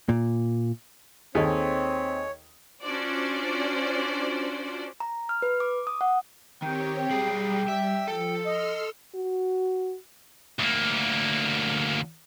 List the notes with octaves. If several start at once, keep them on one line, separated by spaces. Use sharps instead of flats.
A#2
D#2 C4 G#4 A4 C#5 D#5
C#4 D4 F4 F#4 C5 D5
A#5
F6
B4
D6
D#6
F#5
D#3 C4 G4 C#5 G5
B1 G3 G4 G#4
E5
F3 A4
D#5 C6 E6 F6
F#4
D2 A#3